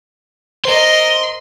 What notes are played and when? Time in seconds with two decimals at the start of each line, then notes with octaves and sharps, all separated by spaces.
0.65 A#4 C5 D#5 C6